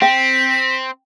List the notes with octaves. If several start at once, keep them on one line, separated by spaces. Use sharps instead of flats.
C4 G5 B6